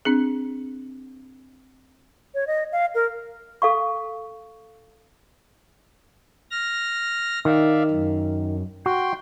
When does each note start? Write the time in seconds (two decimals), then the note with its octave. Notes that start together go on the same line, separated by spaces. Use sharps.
0.05 C4 D4 G#4
2.34 C#5
2.47 D#5
2.72 F5
2.95 A#4
3.62 A4 F5 C#6
6.51 F6 A#6
7.45 D#3 D5 E5 F5
7.91 F#2
8.86 F#4 G5 C6